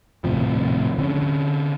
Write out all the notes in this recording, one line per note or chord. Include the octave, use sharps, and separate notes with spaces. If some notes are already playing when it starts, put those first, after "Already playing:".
D#1 A2 C3 F3
D3 C#4